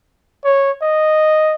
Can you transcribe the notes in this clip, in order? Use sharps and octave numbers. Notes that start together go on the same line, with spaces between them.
C#5
D#5